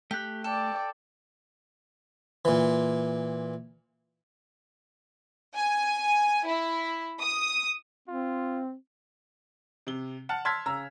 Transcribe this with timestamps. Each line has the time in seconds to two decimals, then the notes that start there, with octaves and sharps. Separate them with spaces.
0.11 A3 G4 F#6
0.44 A4 D5 G5
2.45 A#2 E3
5.55 G#5
6.46 E4
7.19 D#6
8.08 C4 F4
9.87 C3 G7
10.29 F#5 A5 F6
10.45 A5 C6 E6 F6 G#6 B6
10.66 C#3 A#5 E6